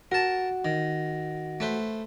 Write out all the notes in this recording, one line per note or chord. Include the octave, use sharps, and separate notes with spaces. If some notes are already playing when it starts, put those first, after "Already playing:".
F#4 A#4 F#5 A5
D#3
A3 B4 C5